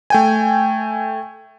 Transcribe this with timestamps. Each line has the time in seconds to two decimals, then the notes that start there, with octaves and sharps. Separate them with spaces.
0.10 A3 G5 G#5